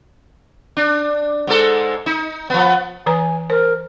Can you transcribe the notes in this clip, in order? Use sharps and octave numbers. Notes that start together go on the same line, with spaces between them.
D4
G#2 G#3 A4
D#4
F3 B3
E3 B4 G#5 A#5
A#4 C5